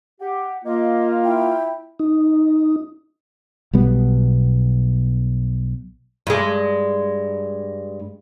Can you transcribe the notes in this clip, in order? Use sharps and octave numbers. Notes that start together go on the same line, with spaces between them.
G4 F#5
A#3 F4 D#5
E4 G5
D#4
B1 B2 G3 B3
G2 G#3